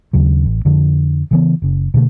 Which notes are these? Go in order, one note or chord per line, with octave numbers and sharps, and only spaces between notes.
D#2 C#3 F#3
A1
F2 D3 F3
C#3 E3 B3
F#1 C#3
B2 D3 E3 A3